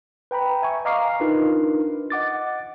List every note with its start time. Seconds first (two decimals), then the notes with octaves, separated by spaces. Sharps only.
0.31 B4 G5 A#5 B5
0.62 E5 G#5 C#6
0.85 D#5 F5 A#5 D6 F6 C7
1.20 D4 D#4 F4 A#4 B4
2.10 D#5 F#5 D6 A6